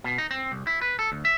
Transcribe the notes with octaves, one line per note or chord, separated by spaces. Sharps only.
B2
D#4
C4
C2
E4
B4
A4
D2
E5